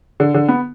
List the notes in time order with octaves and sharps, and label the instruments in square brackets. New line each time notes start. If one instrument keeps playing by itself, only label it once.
[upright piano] D3
D3
B3